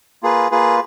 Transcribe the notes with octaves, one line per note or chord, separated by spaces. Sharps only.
A#3 F4 G#4 B4
A#3 F4 G#4 B4